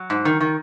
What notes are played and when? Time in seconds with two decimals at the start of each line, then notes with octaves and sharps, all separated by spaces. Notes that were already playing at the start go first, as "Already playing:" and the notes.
Already playing: F#3
0.10 G#2
0.25 D#3
0.40 D#3